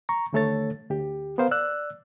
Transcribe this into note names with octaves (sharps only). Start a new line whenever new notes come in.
A#5 C#6
D#2 D3 A3 A4 C#5 A6
D2 G4
B3 A#4 C5 F5
D5 E6 F#6